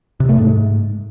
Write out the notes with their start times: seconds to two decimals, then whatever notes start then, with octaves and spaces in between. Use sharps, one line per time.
0.20 C3
0.29 A3
0.38 G#2